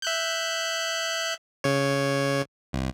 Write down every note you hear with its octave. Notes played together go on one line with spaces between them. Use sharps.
E5 F#6 G6
C#3 C#5
C2